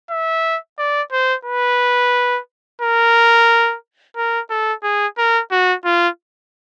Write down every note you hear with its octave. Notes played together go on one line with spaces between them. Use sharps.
E5
D5
C5
B4
A#4
A#4
A4
G#4
A#4
F#4
F4